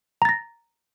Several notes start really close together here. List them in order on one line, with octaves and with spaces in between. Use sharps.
A#5 A6 A#6